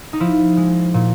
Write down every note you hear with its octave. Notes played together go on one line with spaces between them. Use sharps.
D#4
F3 E4
G#3
A#2